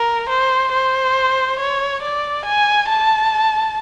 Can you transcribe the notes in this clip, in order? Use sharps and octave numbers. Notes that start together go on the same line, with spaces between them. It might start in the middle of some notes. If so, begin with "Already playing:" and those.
Already playing: A#4
C5
C5
C#5
D5
G#5
A5